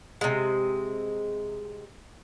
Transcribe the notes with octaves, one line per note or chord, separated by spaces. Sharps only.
C3 G#3